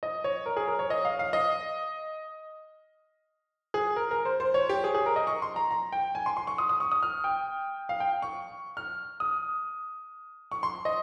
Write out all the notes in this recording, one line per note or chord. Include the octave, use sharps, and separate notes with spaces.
D#5
C#5
A#4
G#4
A#4
C#5
D#5
F5
F5
D#5
G#4
A#4
A#4
C5
C5
C#5
G4
G#4
G#4
A#4
D#5
C#6
C6
A#5
A#5
G5
G#5
C6
C6
C#6
D#6
D#6
C#6
D#6
F6
G5
F5
G5
C#6
F6
D#6
C#6
C6
D#5